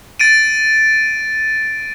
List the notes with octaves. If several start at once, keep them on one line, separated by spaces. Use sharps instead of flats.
A6 D7 D#7